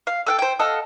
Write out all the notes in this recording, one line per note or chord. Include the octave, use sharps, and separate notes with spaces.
F5
A4 F#5 G5
C5 G5
A4 D#5 F5 F#5